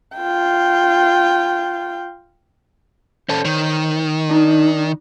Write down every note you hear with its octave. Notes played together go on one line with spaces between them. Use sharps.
F4 G5
C#4 A4 C5 C#5
D#3
D4 D#4